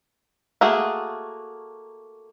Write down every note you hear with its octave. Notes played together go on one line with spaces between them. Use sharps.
A3 A#3 F#4 G#4